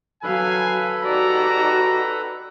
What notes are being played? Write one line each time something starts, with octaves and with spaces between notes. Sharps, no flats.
F#3 A4 B4 F5 G#5 B5
D#4 F#4 G4 D5 A#5